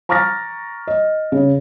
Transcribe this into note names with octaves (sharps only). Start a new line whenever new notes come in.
A#5 C#6 D6 F6 A6 A#6
D#5
C#3